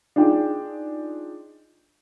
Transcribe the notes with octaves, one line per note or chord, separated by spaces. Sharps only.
D4 D#4 F4 G#4 G5